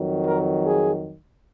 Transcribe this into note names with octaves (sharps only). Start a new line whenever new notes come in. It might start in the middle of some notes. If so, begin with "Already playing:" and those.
Already playing: F2 D#3 F#3
A#4
G#4